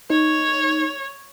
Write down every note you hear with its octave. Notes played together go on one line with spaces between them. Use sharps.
D#4 C#5